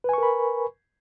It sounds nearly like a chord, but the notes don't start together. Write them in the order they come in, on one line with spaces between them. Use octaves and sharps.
B4 G#5 C#6 A#4 B5